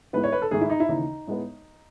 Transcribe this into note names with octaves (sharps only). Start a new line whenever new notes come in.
A2 G#3 B3 B4
C#5
B4
A4
G#2 D#3 A3 G#4
E4
D#4
E4
D#2 C#3 E3 D#4
A2 G#3 B3